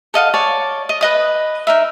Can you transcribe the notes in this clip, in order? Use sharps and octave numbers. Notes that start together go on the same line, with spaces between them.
A4 D#5 F5 F#5
C#5 D5 A5
D#5
B4 D#5 D#6
D#4 A#4 E5